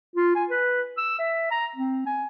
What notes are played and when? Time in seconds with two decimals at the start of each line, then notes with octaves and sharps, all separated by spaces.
0.16 F4
0.35 G#5
0.50 B4
0.98 E6
1.19 E5
1.51 A#5
1.76 C4
2.06 G#5